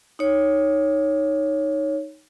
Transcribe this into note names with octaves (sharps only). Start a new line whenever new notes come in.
D#4 C#5